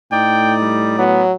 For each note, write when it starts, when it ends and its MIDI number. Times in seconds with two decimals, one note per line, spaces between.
0.12 1.31 45
0.12 1.03 63
0.12 1.03 74
0.12 0.54 79
0.61 0.97 55
0.98 1.32 54
0.98 1.23 59